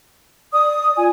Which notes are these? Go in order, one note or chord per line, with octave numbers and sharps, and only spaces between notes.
D5 D#6
F4 G#5